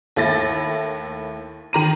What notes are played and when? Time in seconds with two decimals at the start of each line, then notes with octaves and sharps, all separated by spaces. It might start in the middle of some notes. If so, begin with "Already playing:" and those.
0.16 D#2 A3 E4 A6 A#6
1.73 D#3 A#5 D#7